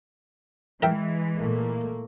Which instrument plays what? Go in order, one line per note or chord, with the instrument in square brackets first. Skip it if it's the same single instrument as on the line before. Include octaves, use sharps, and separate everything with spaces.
[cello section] E3 G#3 [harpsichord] A#4 E5 G5
[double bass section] A#2 A3 A#3